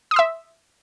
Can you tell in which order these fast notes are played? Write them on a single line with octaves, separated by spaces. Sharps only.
D#6 C6 E6 E5